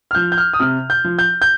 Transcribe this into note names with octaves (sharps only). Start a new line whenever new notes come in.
F6
F3 G6
G6
F6
D#6
C3 F6
G6
F3
G6
G6